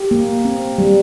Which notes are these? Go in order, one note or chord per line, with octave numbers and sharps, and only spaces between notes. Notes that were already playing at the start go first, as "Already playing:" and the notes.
Already playing: G4
A#3
C4
G3